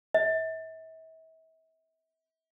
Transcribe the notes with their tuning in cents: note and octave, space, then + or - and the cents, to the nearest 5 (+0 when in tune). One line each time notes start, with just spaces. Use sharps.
E5 -40